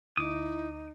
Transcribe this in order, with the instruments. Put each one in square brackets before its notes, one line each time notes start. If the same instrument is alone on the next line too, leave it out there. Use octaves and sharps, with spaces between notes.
[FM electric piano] D2 [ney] D#4 [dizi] E4 [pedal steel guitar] D6 D#6